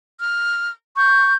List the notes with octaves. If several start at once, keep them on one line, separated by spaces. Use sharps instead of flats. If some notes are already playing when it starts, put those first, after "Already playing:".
F6
C#6 G6